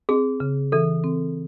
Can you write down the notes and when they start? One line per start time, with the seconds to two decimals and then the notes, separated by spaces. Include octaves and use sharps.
0.09 C4 G#4
0.40 C#3
0.72 E3 A4
1.04 C4